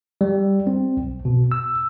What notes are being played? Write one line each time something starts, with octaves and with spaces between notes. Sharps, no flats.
G3
C4
B1
B2
E6